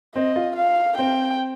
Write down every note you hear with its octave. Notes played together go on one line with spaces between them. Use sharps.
C4 D#5
F4
F5
C4 G5